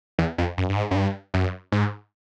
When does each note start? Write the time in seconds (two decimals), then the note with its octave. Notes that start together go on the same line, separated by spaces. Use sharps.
0.19 E2
0.38 F2
0.58 F#2
0.69 G2
0.76 G#2
0.91 F#2
0.95 G2
1.34 F#2
1.72 G#2